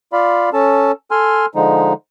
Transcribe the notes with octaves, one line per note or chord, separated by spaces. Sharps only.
F4 D5 F5 B5
C#4 A4 A5
A4 G#5 C6 F6
D3 F3 G#3 D#4